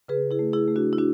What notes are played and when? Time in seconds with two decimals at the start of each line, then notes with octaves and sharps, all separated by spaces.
0.08 C#3 G#4 B4
0.31 E4 G#4
0.39 A3
0.53 E4 G#4
0.68 A3
0.76 D4 F#4
0.93 E4
0.98 D4 F#4